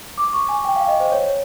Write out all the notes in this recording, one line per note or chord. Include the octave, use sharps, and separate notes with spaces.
D6
C#6
G#5
G5
F5
D#5
C5
C#5